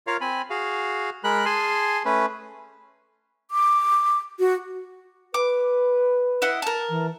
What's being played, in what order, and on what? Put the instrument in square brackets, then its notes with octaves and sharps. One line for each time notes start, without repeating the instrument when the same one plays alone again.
[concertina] F4 A#4 C#5 F5
C4 G#5 B5
F#4 G#4 F5
G#3 A#4 B5 F#6
G#4 G#5 A5 C6
A3 C#4 B4
[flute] D6
F#4
[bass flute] B4 [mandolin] D6
[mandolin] E4 D#5 F#5
A#4 A5
[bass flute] E3